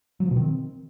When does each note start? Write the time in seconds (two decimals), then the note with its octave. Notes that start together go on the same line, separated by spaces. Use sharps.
0.20 F#3
0.26 F3
0.31 B2
0.36 D#3
0.42 C4